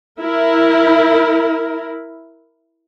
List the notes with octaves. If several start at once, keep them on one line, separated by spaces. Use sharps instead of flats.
E4 A#4